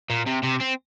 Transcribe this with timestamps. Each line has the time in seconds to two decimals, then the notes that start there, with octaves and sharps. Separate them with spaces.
0.10 A#2
0.27 C3
0.44 C3
0.61 C4